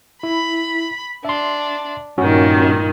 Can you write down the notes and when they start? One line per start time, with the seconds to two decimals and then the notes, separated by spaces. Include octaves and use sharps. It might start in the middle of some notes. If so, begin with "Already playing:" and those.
0.23 E4 B5
1.25 D4 E5 C6
2.18 G2 A#2 D#3 C#4 F#4